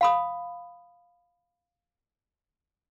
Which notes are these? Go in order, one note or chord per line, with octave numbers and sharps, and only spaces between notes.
F5 B5 D#6